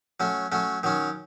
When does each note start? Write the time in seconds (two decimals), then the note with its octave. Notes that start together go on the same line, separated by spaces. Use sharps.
0.20 F#3 A3 C#4
0.52 F#3 A3 C#4
0.83 D#3 F#3 C#4